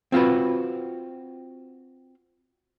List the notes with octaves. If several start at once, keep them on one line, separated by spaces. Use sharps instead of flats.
C4 F4 F#4 B4